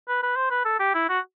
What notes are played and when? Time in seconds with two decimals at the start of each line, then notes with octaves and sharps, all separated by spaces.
0.08 B4
0.23 B4
0.36 C5
0.50 B4
0.65 A4
0.80 G4
0.95 E4
1.09 F#4